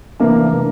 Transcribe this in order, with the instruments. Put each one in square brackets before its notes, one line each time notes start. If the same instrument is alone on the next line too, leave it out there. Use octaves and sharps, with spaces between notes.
[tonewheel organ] C3 E3 A3 D4 [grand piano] A#3